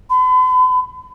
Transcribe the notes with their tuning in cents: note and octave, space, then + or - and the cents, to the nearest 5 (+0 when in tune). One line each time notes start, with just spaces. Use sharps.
B5 +45